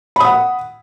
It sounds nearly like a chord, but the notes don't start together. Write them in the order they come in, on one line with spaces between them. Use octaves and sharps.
B5 D#6 F#5